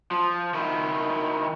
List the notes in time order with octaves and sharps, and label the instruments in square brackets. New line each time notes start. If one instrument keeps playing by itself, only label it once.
[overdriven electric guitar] F3
D#3 E4